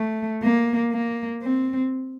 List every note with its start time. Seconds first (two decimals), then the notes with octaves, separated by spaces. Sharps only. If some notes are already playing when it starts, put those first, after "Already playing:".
Already playing: A3
0.43 A#3
0.92 A#3
1.43 C4